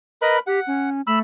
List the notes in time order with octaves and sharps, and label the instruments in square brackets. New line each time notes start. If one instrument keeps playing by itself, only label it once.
[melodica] A#4 B4 B5 [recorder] D#5
[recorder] G4 [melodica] F#5
[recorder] C#4
[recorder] A3 [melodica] B5 E6